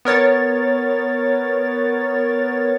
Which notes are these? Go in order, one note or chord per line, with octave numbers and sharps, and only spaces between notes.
B3 A#4 C#5 A6